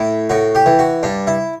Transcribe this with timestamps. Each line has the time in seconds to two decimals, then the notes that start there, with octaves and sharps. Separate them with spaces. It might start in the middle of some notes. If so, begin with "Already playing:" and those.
Already playing: A2 E4
0.30 A2 F#4
0.55 G4
0.66 E3
0.79 F#4
1.03 G2 D4
1.27 E4